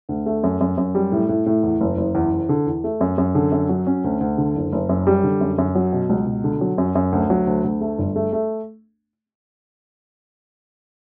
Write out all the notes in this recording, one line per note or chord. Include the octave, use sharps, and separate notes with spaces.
D2
A3
F#2
F#2
F#2
G3
A2
A2
A2
E2
F#1
F#1
E2
E2
D3
E2
A3
F#2
F#2
D3
F#2
F#3
C#4
D2
D2
D3
F#1
F#1
F#2
G3
D3
F#2
F#2
F#3
B2
C#2
B2
D3
F#3
F#2
F#2
D2
F#3
D2
D2
A3
G1
A3
A3